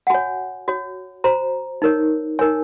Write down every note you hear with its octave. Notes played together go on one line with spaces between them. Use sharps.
F#5
F#4 C#5 G#5
F#4 C#5
F#4 C5 A#5
D#4 A#4 C#5
D#4 A#4 C#5 G#5